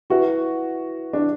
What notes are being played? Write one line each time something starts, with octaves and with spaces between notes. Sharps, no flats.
E4 F#4 B4 E5
D4